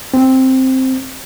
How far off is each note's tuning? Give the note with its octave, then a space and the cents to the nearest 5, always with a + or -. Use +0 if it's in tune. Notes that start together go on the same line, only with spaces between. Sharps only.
C4 +0